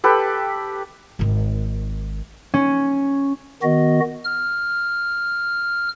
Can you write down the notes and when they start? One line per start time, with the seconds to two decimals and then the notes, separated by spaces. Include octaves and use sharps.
0.04 G4 A4 B4
1.19 G#1 D#3
2.54 C#4
3.62 D#3 B3 F#4 D#5
4.24 F6